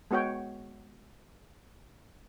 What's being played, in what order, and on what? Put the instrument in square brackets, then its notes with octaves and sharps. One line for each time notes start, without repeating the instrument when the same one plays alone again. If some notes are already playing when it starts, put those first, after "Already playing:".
[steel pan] G#3 B3 F#4 C#5 G5